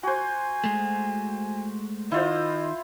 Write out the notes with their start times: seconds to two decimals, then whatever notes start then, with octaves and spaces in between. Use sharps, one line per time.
0.03 F#4 C5 G#5
0.64 G#3 A3
2.12 D#3 E4 F4 C5 D#5